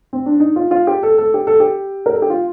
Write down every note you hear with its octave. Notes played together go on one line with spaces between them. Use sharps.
C4
D4
D#4
F4
F4
G4
A4
A4
G4
A4
G4
A#4
A4
G4
F4